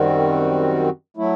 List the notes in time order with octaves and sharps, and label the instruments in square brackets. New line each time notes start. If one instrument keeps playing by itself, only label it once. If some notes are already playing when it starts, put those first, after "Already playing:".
Already playing: [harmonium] F#2 D#3 G3 C4 F#4
F#3 A3 E4